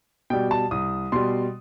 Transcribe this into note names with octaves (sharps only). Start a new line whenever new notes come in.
B2 G3 G5
A5
C2 D#6
B2 G3 C6